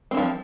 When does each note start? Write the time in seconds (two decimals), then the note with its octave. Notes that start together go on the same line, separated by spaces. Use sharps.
0.11 C4
0.14 E3
0.17 F3